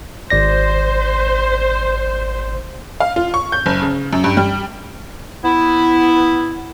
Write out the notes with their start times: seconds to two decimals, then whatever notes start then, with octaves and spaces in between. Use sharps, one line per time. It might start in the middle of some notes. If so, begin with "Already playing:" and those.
0.30 G#1 C5 D5 A#6
3.00 F5
3.16 F4
3.34 C#6
3.52 G6
3.66 F#1
3.82 C#3
4.13 F#2
4.24 G2
4.37 G3
5.44 B3 E4